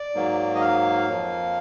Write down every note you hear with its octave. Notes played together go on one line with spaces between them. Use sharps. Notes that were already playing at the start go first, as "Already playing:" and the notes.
Already playing: D5
G#2 F#3 A#3
D#5
F5
F2 F3 A#3